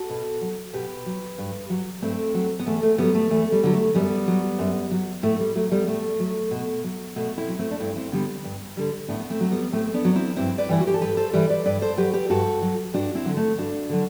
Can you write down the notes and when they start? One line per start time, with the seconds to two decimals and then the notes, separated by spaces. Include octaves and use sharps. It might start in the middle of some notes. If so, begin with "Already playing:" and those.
Already playing: F#4 A4
0.10 B2
0.42 F#3
0.73 B2 G4 B4
1.06 F#3
1.38 G2
1.70 F#3
2.02 G2 A3 C4
2.34 F#3
2.59 B3
2.66 E2 A3
2.83 A3
2.98 D3 F#3 G3 B3
3.14 A3
3.30 E2 A3
3.52 G3
3.63 D3 F#3
3.73 A3
3.94 F#2 G3 B3
4.28 F#3
4.59 F#2
4.91 F#3
5.23 A2 A3
5.40 G3
5.55 F#3 A3
5.71 G3 B3
5.87 A2 A3
6.20 F#3
6.51 B2
6.84 F#3
7.16 B2 A3
7.37 C4 E4
7.48 F#3
7.59 A3 C4
7.71 D4
7.80 G2 C4 E4
7.96 C4 E4
8.12 D3 G3 B3 D4
8.44 G2
8.77 D3 G3
9.08 A2 B3 D4
9.20 B3
9.30 A3 C4
9.40 F#3
9.51 G3 B3
9.73 A2 A3 C4
9.94 B3 D4
10.05 F#3
10.15 C4 E4
10.36 G2 C4 E4
10.58 B4 D5
10.69 E3 G3 E4
10.80 F#4
10.87 G4
10.94 A4
11.01 G2 G4 B4
11.17 A4 C5
11.33 E3 G3 B4 D5
11.50 B4 D5
11.66 G2 B4 D5
11.82 A4 C5
11.97 F#3 G4 B4
12.14 G4 B4
12.30 G2 F#4 A4
12.62 F#3
12.94 G2 D4 F#4
13.15 C4 E4
13.25 D3 F#3
13.37 A3
13.58 G2 D4 F#4
13.90 D3 F#3